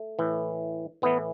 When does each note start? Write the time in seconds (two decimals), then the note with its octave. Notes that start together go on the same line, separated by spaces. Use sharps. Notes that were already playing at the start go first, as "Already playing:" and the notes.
Already playing: A3
0.19 A2 E3
1.02 A2 E3 B3